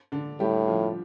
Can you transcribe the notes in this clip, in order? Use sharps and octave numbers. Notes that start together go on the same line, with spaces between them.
D3 D4
A2 G3 G4
F3 F4